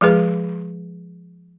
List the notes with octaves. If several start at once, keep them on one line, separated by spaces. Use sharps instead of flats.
F3 G#3 G#4 B4